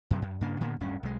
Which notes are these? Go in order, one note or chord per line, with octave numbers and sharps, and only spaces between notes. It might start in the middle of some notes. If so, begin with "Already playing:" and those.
F#2 C3 E3 F#3
F#2
G2 C#3 A#3 D4
A2 D3 A#3 B3
D1 G2 C#4
B1 G#3